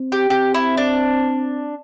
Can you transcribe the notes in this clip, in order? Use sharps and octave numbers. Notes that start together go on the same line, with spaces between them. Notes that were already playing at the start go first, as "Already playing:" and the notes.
Already playing: C4
G4
C4 G4
E4
D4